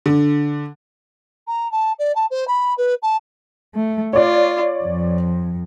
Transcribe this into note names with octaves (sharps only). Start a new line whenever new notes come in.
D3
A#5
A5
D5
A5
C5
B5
B4
A5
A3
F4 C#5 D5
F2